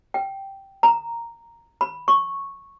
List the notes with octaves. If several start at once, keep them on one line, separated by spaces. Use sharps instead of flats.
G5
A#5
B5
C#6